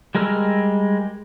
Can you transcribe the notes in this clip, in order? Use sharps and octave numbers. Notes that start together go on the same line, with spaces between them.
G3 G#3 A#4 E6 F6